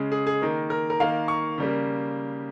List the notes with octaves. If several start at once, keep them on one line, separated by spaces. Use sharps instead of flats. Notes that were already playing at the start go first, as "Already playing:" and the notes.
Already playing: C#3 G#3
G#4
G#4
D#3 A#3
A#4
A#4
D#3 A#3 F5
C#6
C#3 G3 A#3